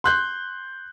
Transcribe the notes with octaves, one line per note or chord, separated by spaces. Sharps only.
C6 F#6 G6